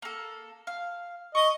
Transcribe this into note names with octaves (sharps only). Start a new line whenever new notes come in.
A#3 A4
F5
D#5 C#6